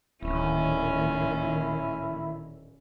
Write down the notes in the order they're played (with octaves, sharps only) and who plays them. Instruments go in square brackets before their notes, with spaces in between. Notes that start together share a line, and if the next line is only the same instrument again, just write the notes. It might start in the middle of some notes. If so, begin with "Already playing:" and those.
[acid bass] D1 [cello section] A#2 D#3 A#3 [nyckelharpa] C#4 [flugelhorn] E4